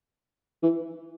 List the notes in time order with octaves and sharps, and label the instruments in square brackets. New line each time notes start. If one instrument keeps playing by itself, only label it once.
[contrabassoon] E3